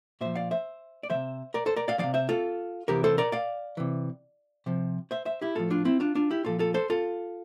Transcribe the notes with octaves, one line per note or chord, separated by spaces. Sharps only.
A#2 F3 C5 E5
D5 F5
C5 E5
D5
C3 E3 C5 E5
A#4 D5
A4 C5
A#4 D5
D5 F5
C3 F3 D5 F5
C5 E5
F4 A4
C3 E3 G4 A#4
A4 C5
A#4 D5
D5 F5
C3 E3
C3 F3
C5 E5
C5 E5
E4 G4
A2 F3 F4 A4
D4 F4
C4 E4
D4 F4
D4 F4
E4 G4
A#2 F3 F4 A4
F4 A4
A4 C5
F4 A4